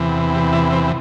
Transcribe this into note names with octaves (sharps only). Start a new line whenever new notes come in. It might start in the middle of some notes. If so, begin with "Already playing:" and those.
Already playing: E2 C3 E3
G4
E4
C4